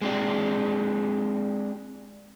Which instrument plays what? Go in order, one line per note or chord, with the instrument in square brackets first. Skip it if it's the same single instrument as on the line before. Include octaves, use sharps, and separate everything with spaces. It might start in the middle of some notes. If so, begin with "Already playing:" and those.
[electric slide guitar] G#3 C4 D4 G4